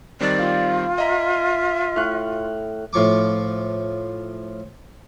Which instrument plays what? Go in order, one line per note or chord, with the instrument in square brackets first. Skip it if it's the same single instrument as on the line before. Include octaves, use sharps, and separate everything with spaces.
[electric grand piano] D#3 G3 C4 [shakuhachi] D5
[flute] F4 [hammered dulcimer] F5 G5
[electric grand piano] D#5 A#5 [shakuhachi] E5
[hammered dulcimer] A2 C#6 [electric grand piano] F6 F#6
[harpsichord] A2 F3 C#6 D6